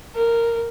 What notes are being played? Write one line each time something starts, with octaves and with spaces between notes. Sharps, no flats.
A#4